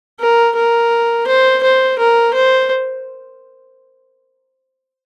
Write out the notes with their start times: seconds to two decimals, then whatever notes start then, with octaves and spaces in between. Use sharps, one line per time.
0.20 A#4
0.56 A#4
1.27 C5
1.63 C5
1.99 A#4
2.34 C5